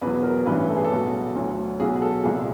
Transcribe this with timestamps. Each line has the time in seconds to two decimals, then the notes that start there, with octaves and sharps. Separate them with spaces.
0.01 E2 B2 F#3 B4
0.23 A#4
0.46 A1 G2 E3 B4
0.69 A4
0.77 G#4
0.85 A4
0.91 B1 B2 F#3
1.35 D2 D3 F#3
1.80 B1 B2 F#3 G#4
1.96 G#4
2.02 A4
2.24 C2 A#2 F3 G#4